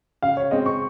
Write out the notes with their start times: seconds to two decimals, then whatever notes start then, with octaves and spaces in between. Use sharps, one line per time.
0.22 C#3 F5
0.37 C#5
0.51 G#3 C4 D#5
0.66 C#6